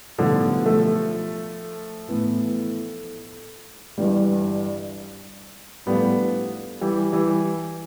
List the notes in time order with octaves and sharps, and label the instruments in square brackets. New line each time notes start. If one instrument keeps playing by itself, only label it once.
[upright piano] B1 A2 G3 B3 [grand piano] D3 F3
[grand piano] F3 A3
[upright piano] A2 E3 B3
G1 G2 E3 G3
[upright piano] A2 F3 A3 D4 [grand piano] G3 B3
[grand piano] E3 G3
E3 G3